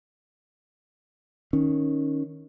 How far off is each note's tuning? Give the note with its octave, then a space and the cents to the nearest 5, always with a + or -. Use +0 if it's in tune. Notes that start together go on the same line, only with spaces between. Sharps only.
D#3 +5 C#4 +0